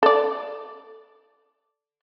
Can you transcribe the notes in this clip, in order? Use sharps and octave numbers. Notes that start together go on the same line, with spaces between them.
A4 D5